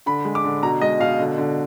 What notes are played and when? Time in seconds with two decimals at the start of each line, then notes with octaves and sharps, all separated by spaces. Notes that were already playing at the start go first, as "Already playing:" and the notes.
0.06 D3 B5
0.25 G#3
0.35 D6
0.44 D3
0.63 B2 A#5
0.81 G#3 D#5
1.00 B2 F5
1.19 D3
1.38 D3